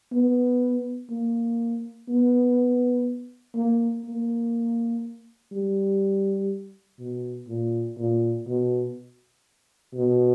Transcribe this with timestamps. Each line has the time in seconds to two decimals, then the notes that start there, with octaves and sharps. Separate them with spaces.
0.12 B3
1.10 A#3
2.08 B3
3.55 A#3
4.05 A#3
5.52 G3
7.00 B2
7.48 A#2
7.98 A#2
8.47 B2
9.94 B2